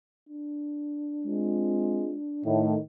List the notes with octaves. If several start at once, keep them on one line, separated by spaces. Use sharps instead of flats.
D4
G#3 C4 F4
A2 D#3